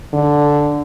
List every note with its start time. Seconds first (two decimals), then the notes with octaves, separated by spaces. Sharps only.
0.13 D3